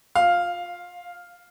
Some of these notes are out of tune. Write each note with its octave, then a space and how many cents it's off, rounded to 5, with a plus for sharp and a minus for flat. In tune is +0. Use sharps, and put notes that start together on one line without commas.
F4 +25 F5 +0